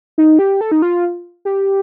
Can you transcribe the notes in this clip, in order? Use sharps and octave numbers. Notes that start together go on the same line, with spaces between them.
D#4
G4
A4
D#4
F4
G4